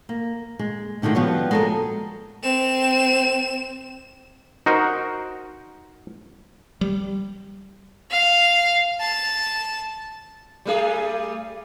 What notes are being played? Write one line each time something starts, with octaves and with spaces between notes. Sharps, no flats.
A#3
G#3
A2 D3 D#3 G#3 F4
F3 G3 B3 F#4 C#5
G#3 A4 A#4
C4 E7
D#4 F#4 A#4 C5
G3
F5
A5
G3 A3 G#4